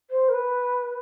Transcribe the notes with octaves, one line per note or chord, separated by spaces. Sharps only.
C5
A#4
B4